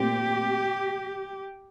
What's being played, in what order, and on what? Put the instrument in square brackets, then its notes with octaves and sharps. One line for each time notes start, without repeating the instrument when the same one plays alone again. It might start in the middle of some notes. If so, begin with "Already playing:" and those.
Already playing: [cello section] A#2 A3 C4 G4